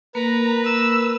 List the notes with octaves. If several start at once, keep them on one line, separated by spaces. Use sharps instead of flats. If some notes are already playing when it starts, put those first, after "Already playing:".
A#3 A#4 B4 A#5
E6